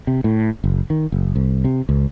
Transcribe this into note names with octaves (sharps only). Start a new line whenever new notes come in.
C3
A2
F#1
D#3
F#1
C2
C3
C#2